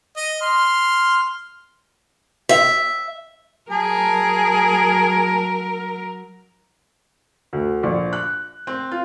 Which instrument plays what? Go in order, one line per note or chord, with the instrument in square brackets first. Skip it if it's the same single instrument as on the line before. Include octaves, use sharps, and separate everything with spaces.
[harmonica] D#5
C6 F6
[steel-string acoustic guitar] E5
[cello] F#3 A#4 [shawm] G#4 [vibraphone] G#5 A5
[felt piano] D2
A#1
F#6
C4
F4